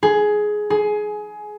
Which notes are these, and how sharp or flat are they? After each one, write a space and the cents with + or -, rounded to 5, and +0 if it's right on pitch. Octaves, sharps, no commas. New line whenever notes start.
G#4 +15
G#4 +20